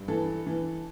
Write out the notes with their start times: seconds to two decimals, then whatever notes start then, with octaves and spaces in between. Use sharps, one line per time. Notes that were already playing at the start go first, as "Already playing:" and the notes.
Already playing: G2
0.08 E3 A4
0.47 E3